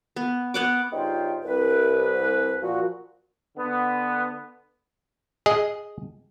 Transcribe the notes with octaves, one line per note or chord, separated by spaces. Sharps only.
B3
B3 F#5 D6
G2 C#3 D#4 F4 C5 G5
C2 B4
A#2 F3 F#4
D3 B3
G#4 D#5